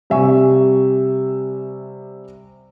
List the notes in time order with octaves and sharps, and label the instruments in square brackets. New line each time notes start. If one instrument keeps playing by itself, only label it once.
[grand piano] C3 G3 E5 G#5 C#6